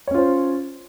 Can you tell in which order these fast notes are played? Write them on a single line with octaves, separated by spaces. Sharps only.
C#5 C#4 F4 C5